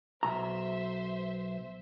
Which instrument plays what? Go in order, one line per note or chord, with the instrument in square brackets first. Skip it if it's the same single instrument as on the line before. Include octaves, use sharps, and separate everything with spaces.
[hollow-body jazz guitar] B1 A#5 [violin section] C5 E5